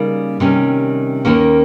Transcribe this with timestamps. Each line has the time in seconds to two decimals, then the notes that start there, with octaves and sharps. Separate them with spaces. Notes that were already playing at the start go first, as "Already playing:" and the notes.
Already playing: C#3 G3 A#3 D#4
0.40 C3 D#3 G3 C#4
1.25 D#2 D#3 A#3 C#4